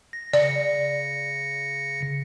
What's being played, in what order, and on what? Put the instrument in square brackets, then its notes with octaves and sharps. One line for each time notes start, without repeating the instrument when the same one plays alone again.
[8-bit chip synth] A#6
[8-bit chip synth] C#3 A#6 C#7 [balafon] D5